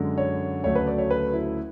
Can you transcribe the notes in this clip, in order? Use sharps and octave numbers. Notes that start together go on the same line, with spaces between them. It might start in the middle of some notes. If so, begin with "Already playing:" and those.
Already playing: F#2 D3 G#3
C#5
D2 C#3 F#3 A3 C#5
B4
D5
C#5
B4
E4